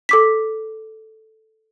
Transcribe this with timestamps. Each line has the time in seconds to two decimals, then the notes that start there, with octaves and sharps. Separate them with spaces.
0.09 A4 D6 B6